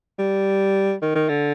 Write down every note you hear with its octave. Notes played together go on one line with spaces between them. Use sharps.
G3
D#3
D#3
D3